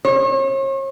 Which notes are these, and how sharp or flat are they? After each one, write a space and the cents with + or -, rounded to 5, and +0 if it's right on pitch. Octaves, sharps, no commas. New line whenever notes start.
C#5 -40